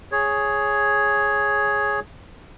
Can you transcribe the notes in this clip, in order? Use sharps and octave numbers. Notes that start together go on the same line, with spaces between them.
G#4 C#5